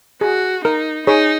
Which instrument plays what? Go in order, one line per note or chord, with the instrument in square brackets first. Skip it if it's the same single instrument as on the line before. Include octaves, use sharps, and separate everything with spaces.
[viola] F#4 [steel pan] G#4
[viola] D#4 [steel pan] A#4
[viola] D#4 [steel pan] G#4 C#5